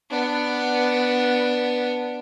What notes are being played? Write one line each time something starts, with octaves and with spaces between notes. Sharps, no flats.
B3 D4